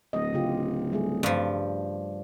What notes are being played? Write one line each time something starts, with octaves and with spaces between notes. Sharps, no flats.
D1 D#5
C#3 F4 G4
G3 A3 G#4
G2 F3